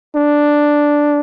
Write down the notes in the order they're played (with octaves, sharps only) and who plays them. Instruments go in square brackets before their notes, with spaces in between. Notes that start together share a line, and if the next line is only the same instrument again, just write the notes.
[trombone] D4